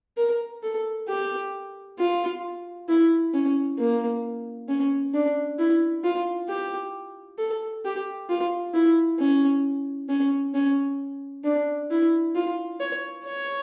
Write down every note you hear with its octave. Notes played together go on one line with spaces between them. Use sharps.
A#4
A4
G4
F4
E4
C#4
A#3
C#4
D4
E4
F4
G4
A4
G4
F4
E4
C#4
C#4
C#4
D4
E4
F4
C#5
C#5